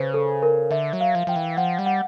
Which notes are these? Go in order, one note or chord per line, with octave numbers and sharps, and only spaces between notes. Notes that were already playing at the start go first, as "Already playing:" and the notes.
Already playing: C#3 B4 C5
A4
A#4
D3 E5
F#3
F5
F3
F3 G5
E3
F3 F#5
G3
F#5